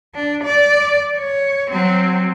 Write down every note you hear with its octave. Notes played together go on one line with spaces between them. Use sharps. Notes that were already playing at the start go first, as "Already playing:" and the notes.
D4
D5
C#5
F#3 C4